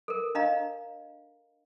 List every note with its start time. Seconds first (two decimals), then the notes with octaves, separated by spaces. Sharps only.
0.08 A4 A#4
0.35 D4 D#5 F5 A#5